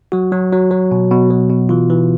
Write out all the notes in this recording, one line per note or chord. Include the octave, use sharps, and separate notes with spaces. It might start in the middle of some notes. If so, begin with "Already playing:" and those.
F#3 F#4
F#3
F#3
F#3
B2
B2
F#3
B2
E3 F4
E3